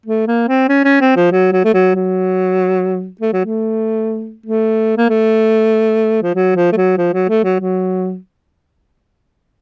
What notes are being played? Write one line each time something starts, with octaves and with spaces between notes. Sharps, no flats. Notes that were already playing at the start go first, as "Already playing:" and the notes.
A3
A#3
C4
C#4
C#4
C4
F3
F#3
F#3
A3
F#3
F#3
A3
F#3
A3
A3
A#3
A3
F3
F#3
F3
A3
F#3
F3
F#3
A3
F#3
F#3